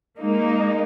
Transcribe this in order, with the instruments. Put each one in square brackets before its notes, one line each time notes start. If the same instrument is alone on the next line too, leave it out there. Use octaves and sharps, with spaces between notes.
[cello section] G#3 A#3 D#4